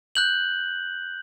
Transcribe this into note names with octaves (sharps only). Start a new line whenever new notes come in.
F#6 G6 F#7